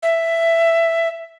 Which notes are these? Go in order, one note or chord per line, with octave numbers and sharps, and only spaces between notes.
E5